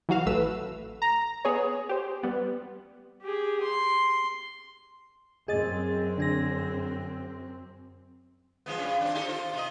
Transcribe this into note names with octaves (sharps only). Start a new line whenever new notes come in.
E3 F#3 F#4 F5
A1 A3 B4 E6
A#5
B3 G#4 C#5
G4 C5
G3 B3
G4 G#4
C6
F#2 C4 G#4 D#5 A6
D3 G#4 A#6
F3 G#3 B3
G2 C#4 F4
C4 D4
D#4 G4 A4
F4 C5
C3 D#5